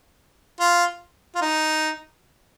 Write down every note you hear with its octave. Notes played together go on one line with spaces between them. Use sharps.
F4
F4
D#4